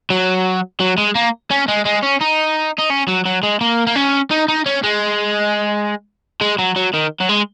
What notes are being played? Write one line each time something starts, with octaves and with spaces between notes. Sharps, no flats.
F#3
F#3
G#3
A#3
C#4
G#3
G#3
C#4
D#4
D#4
C#4
F#3
F#3
G#3
A#3
A#3
C#4
D#4
D#4
C#4
G#3
G#3
F#3
F#3
D#3
F#3
G#3